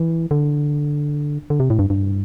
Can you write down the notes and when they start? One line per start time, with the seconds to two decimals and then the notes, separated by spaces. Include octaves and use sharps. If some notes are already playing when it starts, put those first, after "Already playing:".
Already playing: E3
0.31 D3
1.50 D3
1.60 C3
1.70 A2
1.79 G2
1.90 G2